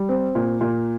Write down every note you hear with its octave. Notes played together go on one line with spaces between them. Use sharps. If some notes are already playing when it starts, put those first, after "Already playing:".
Already playing: G3
C4
A#2
A#2